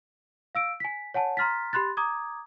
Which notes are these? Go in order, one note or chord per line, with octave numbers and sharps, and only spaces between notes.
F5 E6 D7
G#5 B6
C#5 F#5 G#5 A5
A#5 C6 F6 A6 B6
G4 B5 C6 F#6 A6
A#5 D6 D#6 G#6